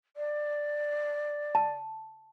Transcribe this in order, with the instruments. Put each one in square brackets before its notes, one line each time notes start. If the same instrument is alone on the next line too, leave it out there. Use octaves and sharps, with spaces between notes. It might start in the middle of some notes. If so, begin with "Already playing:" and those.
[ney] D5
[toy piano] A5